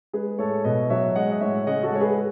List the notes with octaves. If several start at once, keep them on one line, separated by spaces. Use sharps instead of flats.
G#3 G#4 B4
A2 A4 C#5
B2 B4 D#5
F#3 C#5 E5
G#3 D#5 F#5
D#5
A2 C#5 E5
C#3 D#5 F#5
F#4 A4
G#3 C#5
G#4 B4